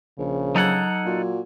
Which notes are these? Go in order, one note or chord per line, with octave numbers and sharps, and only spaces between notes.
A#1 C#3
F#3 D#4 A4 F#5 G#6
A#2 F#4